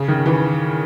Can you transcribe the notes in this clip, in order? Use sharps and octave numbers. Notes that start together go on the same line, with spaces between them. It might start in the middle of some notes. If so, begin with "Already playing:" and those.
Already playing: C#3
D#3
E3